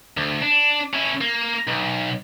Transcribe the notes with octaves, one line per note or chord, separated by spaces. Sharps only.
D2
D4
C#4 E4
A#3
B1